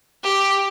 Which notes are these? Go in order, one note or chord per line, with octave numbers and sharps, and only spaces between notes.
G4